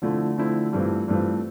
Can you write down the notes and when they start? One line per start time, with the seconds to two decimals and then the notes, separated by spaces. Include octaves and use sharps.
0.02 D3 F3 A3 C4 E4
0.38 D3 F3 A3 C4 E4
0.73 G2 E3 A3 C4 F4
1.08 G2 E3 A3 C4 F4